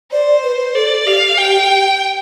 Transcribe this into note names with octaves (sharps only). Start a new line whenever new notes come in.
C5 D5
B4
A4 D5
G4 F5
G5